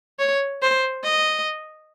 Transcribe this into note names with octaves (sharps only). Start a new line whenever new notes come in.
C#5
C5
D#5